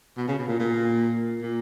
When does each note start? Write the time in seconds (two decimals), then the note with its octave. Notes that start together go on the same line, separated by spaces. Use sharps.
0.17 B2
0.28 C#3
0.38 B2
0.48 A#2
0.59 A#2
1.42 A#2